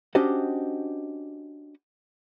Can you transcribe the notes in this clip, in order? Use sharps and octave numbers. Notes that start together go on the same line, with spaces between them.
C#4 D4 F#4 G4 C5 D#5